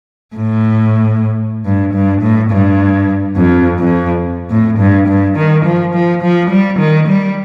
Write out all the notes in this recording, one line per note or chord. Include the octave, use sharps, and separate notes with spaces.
A2
G2
G2
A2
G2
F2
F2
A2
G2
G2
D#3
F3
F3
F3
G3
D#3
G3